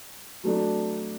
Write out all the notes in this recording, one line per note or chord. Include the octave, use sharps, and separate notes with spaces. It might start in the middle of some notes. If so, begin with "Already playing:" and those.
F#3 A3 D4